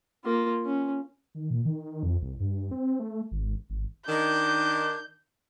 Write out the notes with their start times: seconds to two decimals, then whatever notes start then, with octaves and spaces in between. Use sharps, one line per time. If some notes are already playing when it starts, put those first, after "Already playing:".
0.25 A#3 F4
0.65 C#4
1.35 D#3
1.51 A#2
1.65 D#3
2.03 F2
2.22 C2
2.40 G2
2.71 C4
3.00 A3
3.32 G#1
3.70 G#1
4.09 D#3 D4 G6